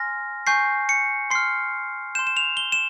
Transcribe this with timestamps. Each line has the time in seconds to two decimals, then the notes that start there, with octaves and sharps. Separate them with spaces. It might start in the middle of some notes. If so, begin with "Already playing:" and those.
Already playing: G#5 C6 F6 A#6
0.47 G#5 C#6 G6 C7
0.89 C#7
1.30 C6 F6 C7
2.15 G6 E7
2.19 C6
2.27 E7
2.37 F7
2.57 G7
2.72 E7